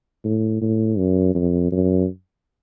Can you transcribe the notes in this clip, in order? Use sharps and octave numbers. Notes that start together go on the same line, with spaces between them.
A2
A2
F#2
F2
F#2